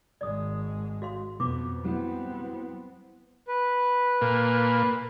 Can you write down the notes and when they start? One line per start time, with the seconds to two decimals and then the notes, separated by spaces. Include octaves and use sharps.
0.21 G#1 G#3 D5 D#6
1.02 F#4 F5 C6
1.40 F2 B2 F3 B3 D6
1.85 F#3 G3 B3 C4 E4
3.48 B4
4.21 A#2